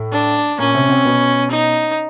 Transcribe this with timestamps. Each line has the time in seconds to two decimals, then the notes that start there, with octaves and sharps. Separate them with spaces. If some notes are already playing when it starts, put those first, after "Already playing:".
Already playing: A2 A3
0.12 D4
0.59 A#2 A#3 C#4
0.75 C3 C4
0.89 C3 C4
1.05 B2 B3
1.51 D#4